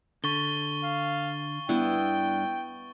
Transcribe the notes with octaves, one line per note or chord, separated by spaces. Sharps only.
D3 C#6 A6 G7
F5
G2 B3 D4 E4 G5